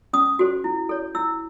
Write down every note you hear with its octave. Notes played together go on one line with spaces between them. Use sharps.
C#4 D#6
F#4 A4 C5
E4
A4 C#5
E4 E6